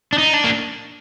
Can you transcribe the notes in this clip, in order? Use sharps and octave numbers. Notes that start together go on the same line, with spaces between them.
D4
D#4
D4
A#3